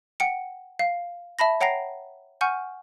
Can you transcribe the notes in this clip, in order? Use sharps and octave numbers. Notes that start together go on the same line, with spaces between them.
F#5 G5 C#7
F5
E5 A5 B5 A#6
C#5 F#5 G5 A#5 A#6 C7
F#5 G#5 C#6 F6 G6